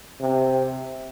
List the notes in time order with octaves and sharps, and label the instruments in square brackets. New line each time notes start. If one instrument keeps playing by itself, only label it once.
[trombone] C3